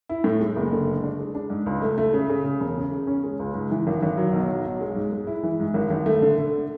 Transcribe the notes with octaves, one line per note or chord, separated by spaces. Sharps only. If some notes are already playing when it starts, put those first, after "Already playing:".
E4
A2
G#3
F#1
D3
G#3
D4
G#3
D4
G#2
C#2
A3
A3
C#3
C#3
C#3
E1
C#3
C#3
C#4
G#3
C#2
G#2
E3
G#1
G#1
F#3
B1
F#3
B1
G#3
G#2
G#3
E4
E3
G#2
G#1
G#1
A3
D3
D3